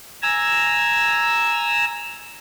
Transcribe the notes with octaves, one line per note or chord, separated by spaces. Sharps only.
G#5 A#5 E6